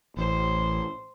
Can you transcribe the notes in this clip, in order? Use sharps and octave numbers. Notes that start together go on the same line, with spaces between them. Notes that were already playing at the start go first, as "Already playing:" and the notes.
A1 C5